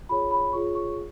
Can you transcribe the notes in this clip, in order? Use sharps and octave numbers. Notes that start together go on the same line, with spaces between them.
F4 G#4 C#5 B5
B5
F4 G#4 C#5 C#6
C#6